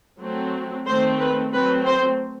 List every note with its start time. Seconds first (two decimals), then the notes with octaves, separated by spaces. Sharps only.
0.20 F#3 A3 C4
0.87 D#3 A3 C4 C5
1.19 B4
1.53 F#3 A3 C4 B4
1.86 C5